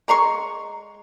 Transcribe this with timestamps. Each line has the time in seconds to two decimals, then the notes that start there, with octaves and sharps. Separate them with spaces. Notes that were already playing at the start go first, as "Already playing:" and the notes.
0.08 G#3 A#5 C6 C#6